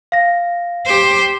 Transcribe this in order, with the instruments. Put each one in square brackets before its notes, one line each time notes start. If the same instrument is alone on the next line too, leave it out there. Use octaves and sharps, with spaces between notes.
[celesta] F5 A#6
[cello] G4 C5